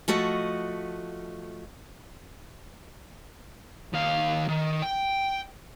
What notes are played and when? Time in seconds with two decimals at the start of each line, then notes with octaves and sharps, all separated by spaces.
0.08 F3 A3 F#4 D#5
3.93 D#2 F5
4.48 D#3
4.83 G5